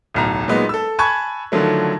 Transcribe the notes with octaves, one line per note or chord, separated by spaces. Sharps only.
D1 B1 A#5
A#2 F#3 G#3 B3 D#4
A4 E6
G#5 A5 B5 C#6 F#6 G#6
D3 D#3 F3 F#3 A3